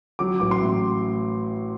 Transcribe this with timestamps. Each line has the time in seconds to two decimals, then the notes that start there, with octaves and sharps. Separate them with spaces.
0.19 F#3 D6
0.40 A1 D6
0.51 C6
0.62 A2